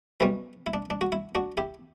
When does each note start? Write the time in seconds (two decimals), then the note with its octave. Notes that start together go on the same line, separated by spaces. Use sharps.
0.20 B1 B2 G3 C#4 E4
0.66 E4
0.74 D4
0.90 D4
1.01 F#4
1.12 E4
1.35 D4 F#4
1.57 E4 G4